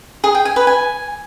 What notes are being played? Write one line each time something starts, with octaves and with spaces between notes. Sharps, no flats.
G#4
G5
G#5
B4
G#5